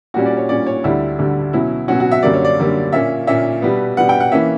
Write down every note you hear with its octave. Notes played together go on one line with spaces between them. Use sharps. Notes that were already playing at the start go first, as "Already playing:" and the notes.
A#2 G3 C#4 F#4
D5
C#5
A#2 G3 C#4 D5
C#5
D2 D3 G3 E4
D2 D3 G3
B2 F#3 C#4 E4
B2 F#3 C#4 F#4
F#4
E5
F#2 D3 G3 A#3 D5
C#5
D5
F#2 D3 G3 A#3
A#2 A#3 C#4 E5
A#2 A#3 C#4 E5
B2 G3 B3
B2 G3 B3 F#5
G5
F#5
E3 A#3 C#4 E5